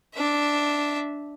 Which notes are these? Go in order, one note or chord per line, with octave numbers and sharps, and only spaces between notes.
D4 E5